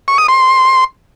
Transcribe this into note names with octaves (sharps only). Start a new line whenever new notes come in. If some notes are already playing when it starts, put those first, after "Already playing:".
C#6
D#6
C6